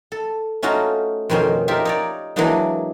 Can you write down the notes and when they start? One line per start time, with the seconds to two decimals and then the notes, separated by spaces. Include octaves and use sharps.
0.12 A4
0.62 A3 C#4 D#4 F4 F#4
1.29 F2 B2 D#3 C#4 C5 C6
1.68 D#4 F4 G4 A#4 E5
1.85 D#4 C#5 D5
2.36 E3 F#3 G#3 A#3 D4 D#4